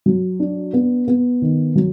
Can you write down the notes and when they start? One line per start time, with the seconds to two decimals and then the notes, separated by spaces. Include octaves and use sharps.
0.06 F#3
0.40 D4
0.73 B3
1.08 B3
1.42 D#3
1.76 F#3